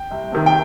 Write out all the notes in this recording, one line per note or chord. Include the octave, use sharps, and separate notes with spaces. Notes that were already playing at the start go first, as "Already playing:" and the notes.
Already playing: G5
C2
C3 D#3
G5